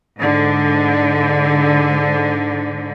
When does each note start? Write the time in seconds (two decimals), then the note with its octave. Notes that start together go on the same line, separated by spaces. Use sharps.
0.18 G#2 D3